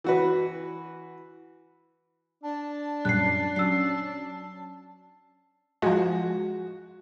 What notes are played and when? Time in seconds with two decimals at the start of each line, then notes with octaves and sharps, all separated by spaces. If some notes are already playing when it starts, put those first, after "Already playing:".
0.04 E3 F#4 B4
2.43 D4 A5
3.05 F#2 A#2 G3 F#6 C7
3.56 F#3 C#4 E6 C7
5.82 F3 G#3 F#4